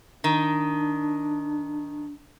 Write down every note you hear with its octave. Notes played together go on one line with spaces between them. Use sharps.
D#3 D4